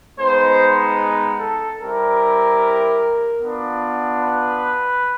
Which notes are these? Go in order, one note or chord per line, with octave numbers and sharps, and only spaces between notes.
G#3 B3 D#4 C5
A4
G3 C4 E4 G4 A#4
B3 D4 F4
B4